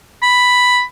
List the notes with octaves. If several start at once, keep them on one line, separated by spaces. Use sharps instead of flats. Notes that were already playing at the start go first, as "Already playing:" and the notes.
B5